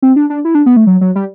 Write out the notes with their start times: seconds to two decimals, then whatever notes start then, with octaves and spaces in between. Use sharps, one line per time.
0.02 C4
0.16 D4
0.30 D4
0.45 E4
0.55 D4
0.66 B3
0.77 A3
0.87 F#3
1.01 F#3
1.15 G3